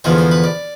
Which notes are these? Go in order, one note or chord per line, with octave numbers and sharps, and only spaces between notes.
E2 D3 F3 G#3 B3 C5
C5
B4
D5